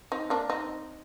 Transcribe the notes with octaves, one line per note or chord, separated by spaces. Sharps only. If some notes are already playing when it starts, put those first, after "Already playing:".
C4 D#4
A#3 D4
C4 D#4